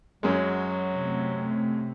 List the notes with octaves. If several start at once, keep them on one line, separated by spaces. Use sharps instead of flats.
F#2 F#3 G#3
C3 A3